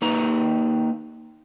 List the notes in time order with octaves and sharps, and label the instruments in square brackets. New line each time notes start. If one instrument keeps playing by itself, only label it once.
[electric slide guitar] A#3 D#4 B4 A#5